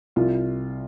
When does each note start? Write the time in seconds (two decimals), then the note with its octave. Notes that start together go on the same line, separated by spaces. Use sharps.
0.16 C2 F4